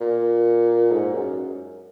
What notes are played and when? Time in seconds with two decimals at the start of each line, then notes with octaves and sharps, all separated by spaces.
0.01 A#2
0.92 G#2
1.14 F#2